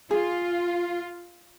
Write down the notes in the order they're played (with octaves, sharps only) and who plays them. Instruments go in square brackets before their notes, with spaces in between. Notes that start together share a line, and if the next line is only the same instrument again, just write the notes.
[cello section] F4 [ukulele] G#4